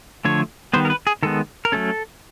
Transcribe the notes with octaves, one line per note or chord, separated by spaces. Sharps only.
D3 F3 A3 C#5
D#3 G3 B3 C5
A#4
B4
G#4
D#3 G#3 B3 A4
A#4
F#3 A3 C#4 A4